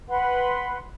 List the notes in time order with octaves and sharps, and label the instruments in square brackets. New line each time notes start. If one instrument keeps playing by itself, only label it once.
[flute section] B4 F#5 B5 C6